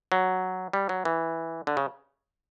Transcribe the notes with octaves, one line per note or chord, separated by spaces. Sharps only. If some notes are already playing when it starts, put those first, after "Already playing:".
F#3
G3
F#3
E3
D3
C#3